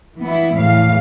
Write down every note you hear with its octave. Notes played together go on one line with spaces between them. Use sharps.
E3 B3 E4
E2 A2 E3 F5